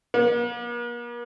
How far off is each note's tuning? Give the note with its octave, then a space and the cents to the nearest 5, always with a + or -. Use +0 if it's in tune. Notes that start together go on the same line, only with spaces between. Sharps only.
A#3 +45